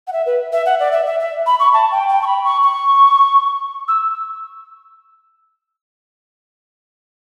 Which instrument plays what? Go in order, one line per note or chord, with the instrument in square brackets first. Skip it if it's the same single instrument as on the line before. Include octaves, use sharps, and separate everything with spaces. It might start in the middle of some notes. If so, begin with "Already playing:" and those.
[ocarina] F#5
E5
B4
E5
F#5
D5
E5
E5
E5
B5
C#6
A5
G5
G5
C#6
B5
C#6
C#6
E6